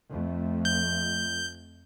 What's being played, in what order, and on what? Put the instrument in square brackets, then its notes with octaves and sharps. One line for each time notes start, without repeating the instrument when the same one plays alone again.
[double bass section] F2 A3
[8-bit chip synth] G6